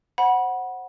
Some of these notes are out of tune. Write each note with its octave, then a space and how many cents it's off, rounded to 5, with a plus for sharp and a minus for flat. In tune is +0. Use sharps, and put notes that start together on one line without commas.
C5 +20 F#5 +0 B5 -30